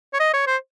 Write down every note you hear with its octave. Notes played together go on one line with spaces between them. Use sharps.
C#5
D#5
C#5
C5